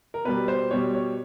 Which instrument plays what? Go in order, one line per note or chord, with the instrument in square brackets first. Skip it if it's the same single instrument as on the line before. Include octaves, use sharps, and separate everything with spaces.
[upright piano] A#4
B2 G3 B4
C5
B2 G3 C#5
C#5